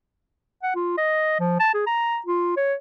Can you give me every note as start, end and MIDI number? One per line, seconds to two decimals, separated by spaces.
0.63 0.75 78
0.76 0.96 65
0.98 1.36 75
1.40 1.58 53
1.60 1.69 81
1.74 1.84 68
1.87 2.19 82
2.27 2.52 65
2.57 2.74 73